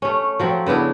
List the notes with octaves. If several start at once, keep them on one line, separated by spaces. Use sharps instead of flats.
A3 C#4
F3 F#3 C4
C#3 B3 D4 E4